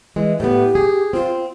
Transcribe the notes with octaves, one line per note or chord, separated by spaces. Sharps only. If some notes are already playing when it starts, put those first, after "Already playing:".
E3 G#3
A2 B3 G4
G#4
C4 F4